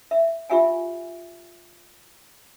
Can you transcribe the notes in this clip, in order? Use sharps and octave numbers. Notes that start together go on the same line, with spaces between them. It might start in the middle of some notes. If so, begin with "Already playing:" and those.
E5
F4 G4 E5 F#5 G#5